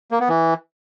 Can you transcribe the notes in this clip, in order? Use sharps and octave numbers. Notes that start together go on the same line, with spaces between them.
A#3
B3
E3